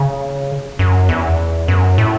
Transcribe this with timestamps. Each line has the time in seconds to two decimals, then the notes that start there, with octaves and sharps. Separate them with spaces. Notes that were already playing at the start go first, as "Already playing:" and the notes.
Already playing: C#3
0.79 F#2
1.09 E2
1.68 F#2
1.98 A2